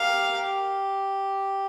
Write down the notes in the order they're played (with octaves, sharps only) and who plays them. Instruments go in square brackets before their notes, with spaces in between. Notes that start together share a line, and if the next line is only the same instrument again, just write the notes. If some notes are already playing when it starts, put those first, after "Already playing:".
Already playing: [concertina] G4 A#4 [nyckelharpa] F5
[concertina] G4